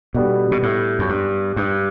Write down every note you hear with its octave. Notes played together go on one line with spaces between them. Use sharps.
B2 G3 B3 D4 A4
B2
A2
F#2
G2
G2